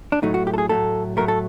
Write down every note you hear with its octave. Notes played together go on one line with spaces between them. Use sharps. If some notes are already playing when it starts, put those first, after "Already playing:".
D4
A2 F#3 A3 D#4
F#4
G4
A4
G#4
A2 F#3 A3 A4
A2 F#3 A3 A#4
A4